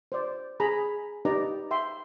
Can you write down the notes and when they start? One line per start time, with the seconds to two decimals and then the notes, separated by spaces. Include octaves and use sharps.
0.12 C5 D5
0.60 G#4 A#5 B5
1.25 D#4 G4 B4 D5 A#5
1.71 E5 G5 C6